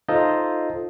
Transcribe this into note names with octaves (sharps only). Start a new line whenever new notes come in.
D#4 F4 A4 C5 D#5